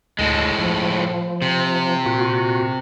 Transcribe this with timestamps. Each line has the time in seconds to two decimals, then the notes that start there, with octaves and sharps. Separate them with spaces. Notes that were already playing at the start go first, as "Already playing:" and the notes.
0.19 D2 A2 G#3 D#5 A5
0.58 F3
1.42 C3
2.06 A#2 F#4